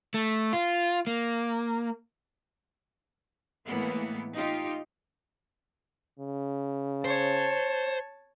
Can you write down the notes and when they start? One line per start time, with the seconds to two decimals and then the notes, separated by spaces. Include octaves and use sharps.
0.14 A3
0.53 F4
1.07 A#3
3.67 A2 E3 G#3 A#3 B3
4.34 D#4 F4 G4
6.19 C#3
7.05 C5 C#5 A5